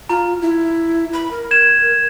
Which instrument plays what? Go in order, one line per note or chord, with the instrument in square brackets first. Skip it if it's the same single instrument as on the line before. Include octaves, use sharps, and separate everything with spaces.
[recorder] F4 [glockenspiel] A#5
[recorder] E4
B5
A#4
[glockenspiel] G#6 E7